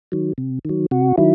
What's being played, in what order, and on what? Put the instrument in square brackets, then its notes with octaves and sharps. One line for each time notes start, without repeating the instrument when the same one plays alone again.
[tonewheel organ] D#3 F#3
C3
D#3 F#3
C3 F#4
D#3 F#3 E4